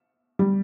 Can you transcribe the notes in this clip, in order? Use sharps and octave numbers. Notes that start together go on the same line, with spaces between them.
G3